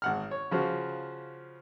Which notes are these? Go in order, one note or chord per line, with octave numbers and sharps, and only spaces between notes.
G#1 F#5 F6
C#5
C#3 F3 F#4